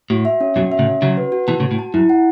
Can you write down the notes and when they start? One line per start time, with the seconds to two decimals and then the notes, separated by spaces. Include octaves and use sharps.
0.10 A2 F#4
0.25 E5
0.41 C#4
0.56 F#2 B2 F#4
0.72 E5
0.79 A2 C#3
0.87 C#4
1.02 C#3 F#3 F#4
1.17 B4
1.32 F#4
1.48 B2 E3 A5
1.60 A2 C#3
1.63 F#4
1.71 A2
1.79 A5
1.94 F#2 E4
2.09 F#5